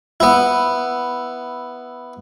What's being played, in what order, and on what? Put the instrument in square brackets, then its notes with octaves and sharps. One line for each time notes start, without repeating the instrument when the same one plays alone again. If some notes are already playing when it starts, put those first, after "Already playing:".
[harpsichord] B3 E4